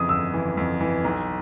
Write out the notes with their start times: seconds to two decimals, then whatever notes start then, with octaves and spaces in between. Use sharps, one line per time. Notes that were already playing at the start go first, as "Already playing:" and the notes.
Already playing: F2 C#3 E3 D#6
0.09 G1 E6
0.34 E3
0.57 F2
0.81 E3
1.04 B1